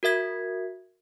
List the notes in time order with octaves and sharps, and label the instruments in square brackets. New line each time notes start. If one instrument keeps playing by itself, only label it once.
[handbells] F#4 A#4 E5 G#6 B6